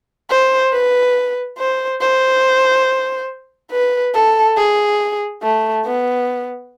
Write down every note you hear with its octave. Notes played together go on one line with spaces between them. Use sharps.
C5
B4
C5
C5
B4
A4
G#4
A3
B3